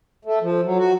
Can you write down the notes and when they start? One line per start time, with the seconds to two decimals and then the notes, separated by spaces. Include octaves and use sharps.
0.25 A3
0.42 F3
0.64 F#3
0.78 F#4